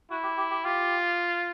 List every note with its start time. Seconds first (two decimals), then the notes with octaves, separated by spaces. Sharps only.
0.11 E4 F#4
0.23 G4
0.37 G4
0.51 G4
0.64 F4 G4